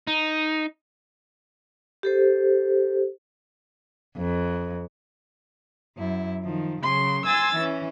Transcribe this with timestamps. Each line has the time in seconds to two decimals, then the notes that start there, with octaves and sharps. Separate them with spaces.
0.07 D#4
2.03 G4 A4 C5
4.17 F2
5.97 F#2 E4
6.43 D#3 F3
6.82 C#3 F#3 C6
7.25 G#5 C6 E6 G#6 A6
7.56 E3 C#4